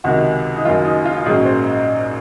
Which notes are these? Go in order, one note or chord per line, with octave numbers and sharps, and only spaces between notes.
C#2 C3 D#3 F#4
D#4
F#1 F#2 D#3 F#3 F4
D#4
F4
A#1 G#2 F#3 A#3 C#4 G#4
C5